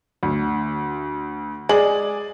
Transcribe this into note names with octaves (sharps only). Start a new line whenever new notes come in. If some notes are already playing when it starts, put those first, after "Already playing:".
D2
G#3 G#4 D5 F#7